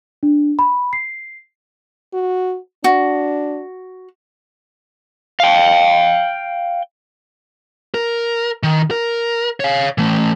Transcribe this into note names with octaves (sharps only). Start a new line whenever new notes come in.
D4
B5
C7
F#4
D4 F#4
F5 G5
A#4
D#3
A#4
C#5 F5
E3 A3